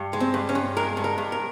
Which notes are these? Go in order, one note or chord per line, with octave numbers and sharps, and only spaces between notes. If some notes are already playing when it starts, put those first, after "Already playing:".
Already playing: G2
G#3
C4
G2
C#4
G2
G#3 A#4
G2
A#4
G2
A#4